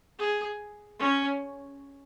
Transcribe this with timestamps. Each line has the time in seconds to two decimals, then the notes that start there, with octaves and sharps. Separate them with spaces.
0.19 G#4
0.99 C#4